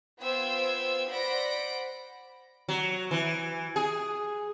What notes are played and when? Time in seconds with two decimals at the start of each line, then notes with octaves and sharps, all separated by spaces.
0.20 B3 F4 C5 G5 E6 G#6
1.08 C5 D5 F#5 B5 A#6 D7
2.69 F#3
3.11 E3
3.76 G#4